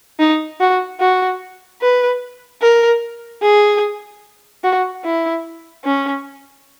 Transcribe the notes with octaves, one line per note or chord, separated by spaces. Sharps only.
D#4
F#4
F#4
B4
A#4
G#4
F#4
E4
C#4